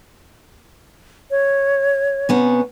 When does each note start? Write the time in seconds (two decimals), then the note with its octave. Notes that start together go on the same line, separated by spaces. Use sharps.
1.31 C#5
2.29 C3 B3 C#4